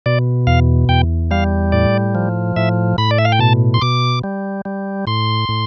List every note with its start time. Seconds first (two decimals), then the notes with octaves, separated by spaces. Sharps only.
0.06 B2 D5
0.47 E2 F5
0.89 E2 G5
1.31 G3 F5
1.72 A2 D5
2.15 F3
2.56 A2 E5
2.98 A2 B5
3.11 D5
3.18 E5
3.25 F5
3.32 G5
3.39 B2 A5
3.74 C6
3.81 B2 D6
4.24 G3
4.65 G3
5.07 A2 C6
5.49 A2